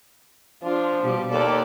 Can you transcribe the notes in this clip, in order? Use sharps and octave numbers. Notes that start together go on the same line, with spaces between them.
F3 D4 F4
B2 G3 G4
D#2 A#3 A4 D5